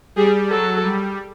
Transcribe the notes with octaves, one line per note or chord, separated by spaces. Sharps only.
G3 G#4
F#3 A4
G3